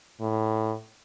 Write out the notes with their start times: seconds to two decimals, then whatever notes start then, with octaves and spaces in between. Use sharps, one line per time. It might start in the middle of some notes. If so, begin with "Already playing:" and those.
0.21 A2